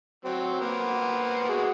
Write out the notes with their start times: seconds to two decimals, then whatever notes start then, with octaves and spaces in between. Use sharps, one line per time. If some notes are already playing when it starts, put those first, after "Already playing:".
0.25 F#3 C4
0.61 A#3 B3 C5
1.49 G#3 F#4 G#4